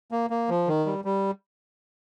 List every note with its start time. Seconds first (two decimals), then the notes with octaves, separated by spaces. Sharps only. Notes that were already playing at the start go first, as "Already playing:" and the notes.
0.11 A#3
0.30 A#3
0.49 F3
0.68 D#3
0.86 G3
1.05 G3